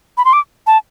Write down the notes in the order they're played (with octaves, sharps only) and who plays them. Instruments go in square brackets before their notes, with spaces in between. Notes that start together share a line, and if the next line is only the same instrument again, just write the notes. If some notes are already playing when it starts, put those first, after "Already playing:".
[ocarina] B5
C6
D6
A5